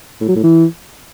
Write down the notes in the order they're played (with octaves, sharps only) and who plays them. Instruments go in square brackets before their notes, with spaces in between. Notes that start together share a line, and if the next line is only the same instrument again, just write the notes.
[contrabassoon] A2
F#3
A2
E3